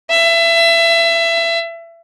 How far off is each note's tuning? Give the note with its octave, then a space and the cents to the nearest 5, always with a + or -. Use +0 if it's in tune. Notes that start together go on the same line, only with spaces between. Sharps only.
E5 +25